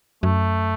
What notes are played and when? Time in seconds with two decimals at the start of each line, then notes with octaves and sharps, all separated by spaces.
0.23 F#2 A3